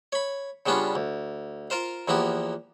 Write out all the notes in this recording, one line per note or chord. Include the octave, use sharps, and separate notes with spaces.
C#5 B5
C#3 G3 B3 C#4 D4 F4
D2
F4 A#4 C5 F5
E2 F3 A#3 B3 G4